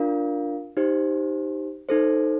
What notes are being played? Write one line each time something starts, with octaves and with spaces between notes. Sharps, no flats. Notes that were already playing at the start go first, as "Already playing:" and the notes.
Already playing: D4 F4 A#4 D5 F5
D#4 G4 C5
D#4 A4 C5